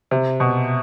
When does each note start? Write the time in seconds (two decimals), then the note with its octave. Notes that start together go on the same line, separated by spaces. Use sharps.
0.11 C3
0.40 B2